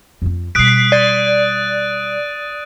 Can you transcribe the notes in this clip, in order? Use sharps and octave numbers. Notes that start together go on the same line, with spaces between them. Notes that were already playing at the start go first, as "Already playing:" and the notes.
F2 C4
B2 G3 D#6 F#6 B6 C7 D7
D5 A6 D#7